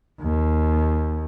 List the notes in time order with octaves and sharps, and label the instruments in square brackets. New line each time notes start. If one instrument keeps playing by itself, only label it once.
[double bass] D#2